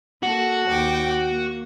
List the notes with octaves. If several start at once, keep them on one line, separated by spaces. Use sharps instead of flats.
A#3 F#4 A4
D#2 G5 D6
A#3